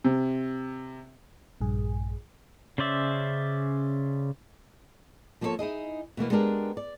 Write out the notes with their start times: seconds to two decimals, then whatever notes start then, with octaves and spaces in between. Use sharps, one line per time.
0.05 C3
1.61 A#1 G2 G#4
2.78 C#3 C#4 C5 D5 E5
5.41 F3 A#3 F4 F#4 A4 C#5
5.59 D#4 E4 G#4 D#5
6.17 B2 E3 A#3 B3
6.30 G#3 B3 D4 G4 A#4
6.77 D5